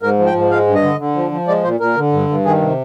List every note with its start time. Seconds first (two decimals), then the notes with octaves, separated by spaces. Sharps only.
0.02 G#2 A#4
0.19 F3
0.26 G5
0.34 G#2
0.50 G#3 F5
0.67 G2
0.75 D#5
0.83 D3
0.99 D3
1.16 F3
1.31 F3
1.48 G#3 D5
1.64 A#2 C5
1.80 A#2 A#4
1.96 D3
2.13 G2
2.29 G2
2.45 D#3 G#4
2.61 C3